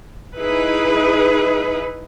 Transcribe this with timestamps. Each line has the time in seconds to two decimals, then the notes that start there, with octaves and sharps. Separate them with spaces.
0.36 D#4 E4 G#4 B4